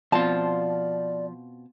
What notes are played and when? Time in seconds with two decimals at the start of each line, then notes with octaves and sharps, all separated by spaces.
0.12 B2 F3 C4 F4 D5 A5